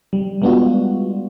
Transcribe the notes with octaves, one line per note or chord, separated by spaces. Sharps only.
G3
G3 G#3 B3 D4 F4 F#4